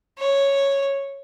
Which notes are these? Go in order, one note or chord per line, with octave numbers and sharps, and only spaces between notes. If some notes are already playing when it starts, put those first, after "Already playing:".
C#5